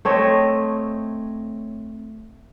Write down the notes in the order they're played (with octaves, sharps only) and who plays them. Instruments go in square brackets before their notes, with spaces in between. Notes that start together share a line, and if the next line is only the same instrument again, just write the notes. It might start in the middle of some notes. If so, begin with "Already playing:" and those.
[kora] A3 C4 C#5 D#5